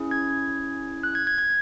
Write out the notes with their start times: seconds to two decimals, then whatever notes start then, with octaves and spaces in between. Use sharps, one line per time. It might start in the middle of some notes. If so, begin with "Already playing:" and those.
Already playing: C#4 E4 G#4
0.11 G#6
1.03 F#6
1.15 G#6
1.27 G#6
1.38 G#6